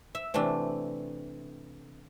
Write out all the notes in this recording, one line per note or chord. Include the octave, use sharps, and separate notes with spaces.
E5
C3 E3 A3 D4